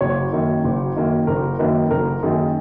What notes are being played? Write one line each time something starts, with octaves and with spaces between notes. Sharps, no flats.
F#1 C#5
F#2 D#3 A#3
F#1
F#2 D#3 A#3
F#1 A#4
F#2 D#3 A#3 B4
F#1 A#4
F#2 D#3 A#3 G#4